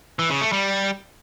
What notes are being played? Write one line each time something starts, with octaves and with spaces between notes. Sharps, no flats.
E3
C#3
A3
G3